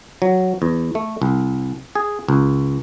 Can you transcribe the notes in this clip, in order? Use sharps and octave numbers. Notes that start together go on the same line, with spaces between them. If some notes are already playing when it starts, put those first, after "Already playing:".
F#3
E2
A3
C2
G#4
C#2